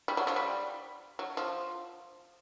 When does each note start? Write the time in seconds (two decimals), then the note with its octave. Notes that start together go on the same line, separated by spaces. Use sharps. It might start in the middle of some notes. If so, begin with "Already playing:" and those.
0.08 G3
0.17 F#3
0.27 F3
0.36 G3
1.19 F#3
1.37 F3